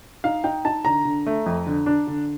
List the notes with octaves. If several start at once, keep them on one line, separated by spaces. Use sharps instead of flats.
D#4 F5
D#4 G5
D#4 A5
D3 A#5
D3
A3
F2
D3
D4
D3